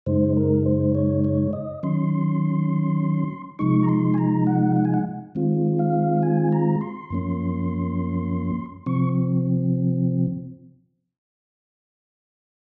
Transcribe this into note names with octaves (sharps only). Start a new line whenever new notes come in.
F#2 C#3 G#3 D#4 C5
A#4
C5
C#5
C#5
D#5
D#3 F#3 C#4 C6
C3 F3 G#3 D#4 C#6
A#5
C6
G#5
A#5
F#5
F#5
G#5
F#5
D#3 G#3 C4 F4
F5
G#5
A#5
C6
F#2 F3 A#3 C#4
C3 F3 C4 C#6